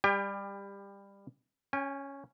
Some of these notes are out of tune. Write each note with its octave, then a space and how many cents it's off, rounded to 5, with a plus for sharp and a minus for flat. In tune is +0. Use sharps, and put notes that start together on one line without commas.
G3 +20 G4 +25 G5 +45
C#4 +0 G#5 -45